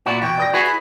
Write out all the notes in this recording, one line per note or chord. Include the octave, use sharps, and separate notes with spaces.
A#2 E4 F#4 D5
E2 B2 G5 C#6
D5 D#6 A#6
E4 F#4 G#4 B4
B5